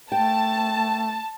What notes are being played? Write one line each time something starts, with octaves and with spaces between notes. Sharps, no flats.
A3 G5 A5